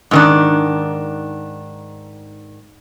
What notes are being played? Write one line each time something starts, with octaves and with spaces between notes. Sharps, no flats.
G#2 D#3 D4